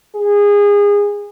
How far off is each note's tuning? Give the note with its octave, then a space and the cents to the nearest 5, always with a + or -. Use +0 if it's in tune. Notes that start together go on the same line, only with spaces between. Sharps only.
G#4 -25